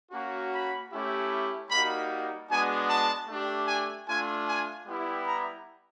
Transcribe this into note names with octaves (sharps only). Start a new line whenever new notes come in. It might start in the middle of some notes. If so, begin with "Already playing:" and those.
A#3 C#4 F#4
B5
A3 C#4 E4 G4
G3 A#3 D#4 F#4 B5
G#3 B3 D4 F#4 G#5
A5
A3 D4 G4
G#5
A3 D4 F4 G#5
G#5
G3 B3 E4 G4
A#5